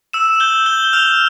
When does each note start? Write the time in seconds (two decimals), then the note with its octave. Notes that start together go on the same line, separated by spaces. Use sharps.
0.13 E6 E7
0.40 G6 G7
0.66 G6 G7
0.84 G7
0.93 F6 F7